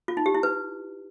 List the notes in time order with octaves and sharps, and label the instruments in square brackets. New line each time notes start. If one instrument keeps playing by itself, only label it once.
[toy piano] F4
D#4
G4
E4
B4